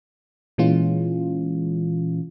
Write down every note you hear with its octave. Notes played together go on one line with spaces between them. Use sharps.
A#2 E3 G#3 C#4 F4